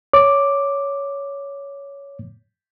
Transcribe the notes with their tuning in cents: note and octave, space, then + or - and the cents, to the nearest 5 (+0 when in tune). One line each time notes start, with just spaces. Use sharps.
C#5 +10 D6 +0